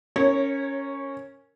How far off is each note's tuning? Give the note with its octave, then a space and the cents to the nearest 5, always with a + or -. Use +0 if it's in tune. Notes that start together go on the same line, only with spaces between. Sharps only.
C#4 +0 A#4 -20 C#5 -25